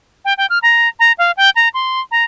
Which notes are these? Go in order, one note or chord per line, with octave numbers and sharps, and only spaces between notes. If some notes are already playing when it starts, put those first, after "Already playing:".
G5
G5
F6
A#5
A#5
F5
G5
A#5
C6
A#5